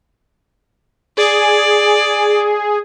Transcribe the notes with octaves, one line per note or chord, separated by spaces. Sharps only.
G#4 D5